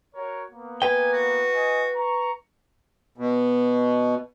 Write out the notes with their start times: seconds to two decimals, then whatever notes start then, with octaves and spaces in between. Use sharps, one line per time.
0.14 F#4 A#4 C#5
0.52 A#3 B3
0.82 B4 G5 G#5
1.13 F#4
1.51 D#5 G#5
1.95 A#5 C#6
3.18 B2